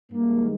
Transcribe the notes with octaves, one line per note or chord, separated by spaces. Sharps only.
G2 D#3 G#3 A#3